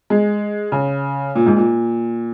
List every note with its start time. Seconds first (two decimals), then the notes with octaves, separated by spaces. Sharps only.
0.10 G#3
0.72 C#3
1.35 A#2
1.46 G#2
1.56 A#2